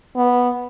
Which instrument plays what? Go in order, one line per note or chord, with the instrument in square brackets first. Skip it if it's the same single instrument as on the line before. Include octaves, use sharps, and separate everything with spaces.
[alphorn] B3